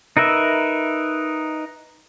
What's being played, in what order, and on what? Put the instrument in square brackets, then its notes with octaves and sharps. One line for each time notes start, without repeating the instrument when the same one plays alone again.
[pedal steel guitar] D#4 A#4 B4 E5